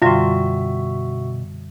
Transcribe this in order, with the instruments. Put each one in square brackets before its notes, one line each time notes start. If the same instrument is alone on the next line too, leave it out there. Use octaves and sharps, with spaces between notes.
[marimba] F#2 D3 G3 [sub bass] B2 [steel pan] F4 [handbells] F#4 E5